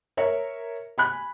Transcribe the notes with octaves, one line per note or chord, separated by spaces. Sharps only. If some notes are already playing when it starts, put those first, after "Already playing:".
A#4 C#5 E5
G#5 B5 F#6